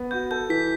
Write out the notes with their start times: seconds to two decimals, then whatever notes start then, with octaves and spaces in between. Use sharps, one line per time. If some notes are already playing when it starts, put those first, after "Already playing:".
Already playing: B3
0.11 F#4 G6
0.31 A4 G6
0.50 E3 B6